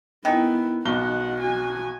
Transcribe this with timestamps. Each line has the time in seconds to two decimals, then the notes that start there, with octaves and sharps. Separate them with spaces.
0.25 D#3 B3 E4 G5 G#5
0.85 B1 B2 F#5 G7
1.41 F#4 G#5